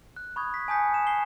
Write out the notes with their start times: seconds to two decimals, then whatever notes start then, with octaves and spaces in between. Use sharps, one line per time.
0.16 F#6
0.36 B5 C#6 D#6 G#6
0.54 B6
0.68 G#5 A5 D#6 G6 B6 C#7
0.94 E7
1.07 C7 G7